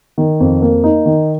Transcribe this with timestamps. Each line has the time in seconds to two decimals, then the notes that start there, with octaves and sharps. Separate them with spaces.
0.18 D#3
0.40 F2
0.62 A#3
0.84 D#4
1.06 D#3